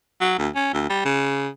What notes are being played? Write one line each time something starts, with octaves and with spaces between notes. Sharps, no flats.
F#3
D2
C#4
D2
G3
C#3